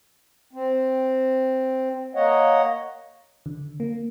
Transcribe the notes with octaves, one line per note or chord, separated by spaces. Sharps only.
C4
A#3 C#5 D#5 F#5
D3
A#3